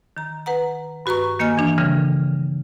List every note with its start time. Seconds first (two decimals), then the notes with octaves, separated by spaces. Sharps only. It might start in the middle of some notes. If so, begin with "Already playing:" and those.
0.17 D#3 A#5
0.46 B4 F#5 A#5
1.06 G2 F#4 B4 A#5 C#6
1.39 D#3 A#3 D#5 G#5 F6
1.58 E3 D4
1.78 C#3 E3 G3